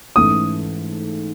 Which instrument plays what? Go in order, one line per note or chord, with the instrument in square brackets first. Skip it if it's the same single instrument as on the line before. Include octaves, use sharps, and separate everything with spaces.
[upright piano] G#2 E3 A3 C#4 [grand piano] D#6